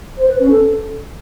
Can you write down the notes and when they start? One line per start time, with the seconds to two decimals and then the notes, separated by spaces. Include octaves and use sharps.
0.17 C5
0.29 B4
0.40 C#4
0.51 A4